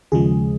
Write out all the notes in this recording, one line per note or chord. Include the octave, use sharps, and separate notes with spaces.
D#2 C#3 F3 G#3 G#4